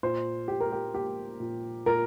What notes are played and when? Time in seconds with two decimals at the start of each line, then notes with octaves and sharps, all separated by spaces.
0.03 A#2 C5
0.48 A#2 G4
0.60 A#4
0.72 G4
0.94 A#3 G4
1.40 A#2
1.86 A#2 A#4